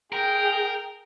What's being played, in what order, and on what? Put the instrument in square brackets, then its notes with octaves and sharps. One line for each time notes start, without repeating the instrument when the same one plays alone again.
[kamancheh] G#4 G5 [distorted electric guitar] A#4